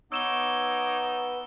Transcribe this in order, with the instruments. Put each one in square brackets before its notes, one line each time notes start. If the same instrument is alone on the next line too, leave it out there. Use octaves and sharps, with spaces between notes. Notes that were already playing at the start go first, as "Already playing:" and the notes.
[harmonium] B3 [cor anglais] D#4 [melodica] C#5 D6 [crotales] E6 E7 G7